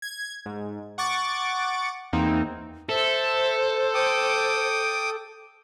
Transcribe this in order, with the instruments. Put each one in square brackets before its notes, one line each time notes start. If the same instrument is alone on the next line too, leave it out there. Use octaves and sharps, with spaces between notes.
[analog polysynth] G#6
G#2
F#5 C#6 D6 A6
E2 A#3 C4 D#4
[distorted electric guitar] A4 [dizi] C5 [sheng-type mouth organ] E5
[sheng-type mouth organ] G5 D6 D#6